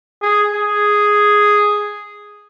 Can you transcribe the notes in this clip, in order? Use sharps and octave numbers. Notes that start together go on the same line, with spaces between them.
G#4
G#4